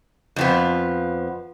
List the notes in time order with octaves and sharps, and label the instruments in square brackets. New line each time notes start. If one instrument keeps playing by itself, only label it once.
[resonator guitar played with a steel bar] F2 F3 B3